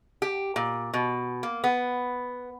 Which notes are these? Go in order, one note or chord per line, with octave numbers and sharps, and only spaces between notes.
G4
A#2
B2
A#3
B3